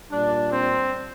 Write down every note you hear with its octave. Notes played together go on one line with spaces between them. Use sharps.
A#2 G3 D4
C4